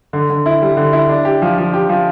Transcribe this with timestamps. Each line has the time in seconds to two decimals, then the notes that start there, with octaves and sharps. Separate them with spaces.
0.13 D3
0.30 D3
0.46 E4
0.62 G3
0.77 D3
0.93 E4
1.09 D4
1.25 G4
1.42 F3
1.58 F3
1.73 G4
1.89 F3